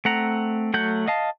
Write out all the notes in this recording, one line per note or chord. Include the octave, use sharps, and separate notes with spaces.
A3 C4 F#5 A#5
F#3 A3 F#5 G6
D#5 F5 A5